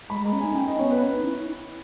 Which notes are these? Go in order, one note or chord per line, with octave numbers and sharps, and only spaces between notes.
G#3 B5
G#3 A#5
C#4
D#4 G#5
C#4 G5
D#5
B3 C#5
B4
C#4
D#4
E4